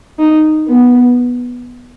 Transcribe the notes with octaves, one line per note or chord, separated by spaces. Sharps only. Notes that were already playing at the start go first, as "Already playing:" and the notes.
D#4
B3